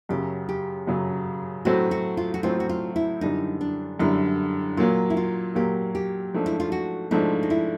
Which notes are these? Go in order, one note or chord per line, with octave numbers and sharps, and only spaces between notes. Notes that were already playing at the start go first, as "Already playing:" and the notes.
F#2 C#3 F#3 G4
G4
F#2 C#3 F#3
A2 F#3 A3 C4 F#4
F#4
F4
F#4
A2 F#3 A3 C4 F4
F#4
F4
E4
F#2 D3 G3 D#4
D4
F#2 D3 G3 E4
A#2 F#3 A#3 F4
E4
F4
A#2 F#3 A#3 G4
G4
G#2 F3 A3 D4
E4
F4
F#4
G#2 F3 A3 D4 E4
D#4
E4